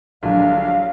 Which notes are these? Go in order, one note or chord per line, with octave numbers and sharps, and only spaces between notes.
A#1 D3 F#3 G3 F5